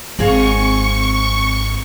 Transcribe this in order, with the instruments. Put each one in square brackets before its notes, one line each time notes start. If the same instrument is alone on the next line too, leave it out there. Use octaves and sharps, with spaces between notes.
[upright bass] G#1 [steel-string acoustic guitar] C4 G#4 F5 [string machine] C#6